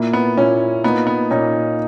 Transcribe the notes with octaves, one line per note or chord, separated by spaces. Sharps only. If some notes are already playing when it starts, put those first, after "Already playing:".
Already playing: A#2 A#3 E4
B3
A#2 A#3 C#4 E4
A#2 A#3 B3 D#4
B3
A#2 A#3 C#4 D#4